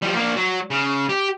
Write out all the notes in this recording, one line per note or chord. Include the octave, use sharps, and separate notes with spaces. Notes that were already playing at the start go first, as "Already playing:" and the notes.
F3 G3
A#3 D4
F#3
C#3
G4